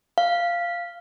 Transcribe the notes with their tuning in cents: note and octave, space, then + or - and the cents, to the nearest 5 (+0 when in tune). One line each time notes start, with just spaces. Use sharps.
F5 -10